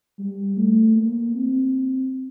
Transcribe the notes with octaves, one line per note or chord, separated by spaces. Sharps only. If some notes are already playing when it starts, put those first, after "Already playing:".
G3
A3
A#3
C4